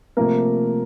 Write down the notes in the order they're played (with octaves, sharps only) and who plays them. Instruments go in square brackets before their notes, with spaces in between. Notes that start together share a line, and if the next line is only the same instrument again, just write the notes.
[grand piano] C3 F3 A3 A#3 A#4